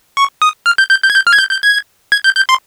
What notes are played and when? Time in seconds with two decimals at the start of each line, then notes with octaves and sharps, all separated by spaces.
0.17 C#6
0.42 D#6
0.66 F6
0.78 G6
0.90 G6
1.03 G6
1.10 G#6
1.15 G6
1.27 F6
1.33 G#6
1.39 G6
1.51 G6
1.63 G#6
2.12 G#6
2.24 G6
2.36 G6
2.49 C6